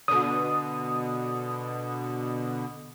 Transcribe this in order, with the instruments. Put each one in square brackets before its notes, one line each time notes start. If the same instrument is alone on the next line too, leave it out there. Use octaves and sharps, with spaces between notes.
[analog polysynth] B2 D3 [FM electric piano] D#6